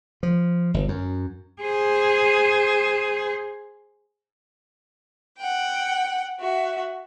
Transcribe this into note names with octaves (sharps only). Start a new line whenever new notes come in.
F3
G1
F#2
G#4 C5
F#5 G5
F#4 E5